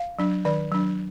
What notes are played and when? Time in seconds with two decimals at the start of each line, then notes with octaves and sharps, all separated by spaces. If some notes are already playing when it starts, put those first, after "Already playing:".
Already playing: F5
0.19 F#3 D4
0.45 D#3 D5
0.72 F#3 D4